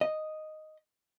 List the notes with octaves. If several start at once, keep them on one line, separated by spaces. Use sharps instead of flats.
D#5